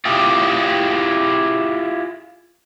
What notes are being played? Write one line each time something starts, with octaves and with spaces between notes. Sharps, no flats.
E4 F4 G4 G#4